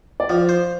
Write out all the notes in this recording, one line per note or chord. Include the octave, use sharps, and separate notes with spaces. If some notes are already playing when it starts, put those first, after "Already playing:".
D5
F3 C5 F5
C5